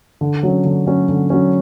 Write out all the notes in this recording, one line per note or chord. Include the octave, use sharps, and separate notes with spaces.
D3
F#3 C#4
D3
F#3 C#4
D3
F#3 C#4